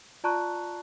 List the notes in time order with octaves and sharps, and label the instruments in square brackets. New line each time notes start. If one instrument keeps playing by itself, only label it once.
[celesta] F4 D5 A5 A#5 C#6 F#6